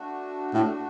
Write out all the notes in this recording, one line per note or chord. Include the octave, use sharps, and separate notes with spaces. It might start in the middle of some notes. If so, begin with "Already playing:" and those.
Already playing: A3 D4 F#4
A2